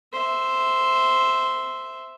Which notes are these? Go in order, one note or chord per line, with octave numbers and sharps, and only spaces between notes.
C5 E5